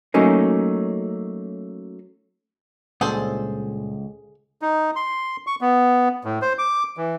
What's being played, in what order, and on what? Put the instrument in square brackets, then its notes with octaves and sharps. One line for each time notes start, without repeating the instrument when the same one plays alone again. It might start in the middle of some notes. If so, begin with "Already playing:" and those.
[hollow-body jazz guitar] F#3 A3 A#3 C#4 D#4
[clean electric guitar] C#2 [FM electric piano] A#2 G3 D4 [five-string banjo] G#4 A4 C5
[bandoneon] D#4
C6
C#6
B3
A2
C5
D6
E3